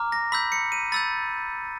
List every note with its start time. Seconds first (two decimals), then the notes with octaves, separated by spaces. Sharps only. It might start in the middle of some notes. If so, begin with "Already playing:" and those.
Already playing: A#5 D6 F6
0.12 A#6
0.32 B5 E6 G6 B6
0.52 C#7
0.72 D#7
0.92 B5 E6 G6 A6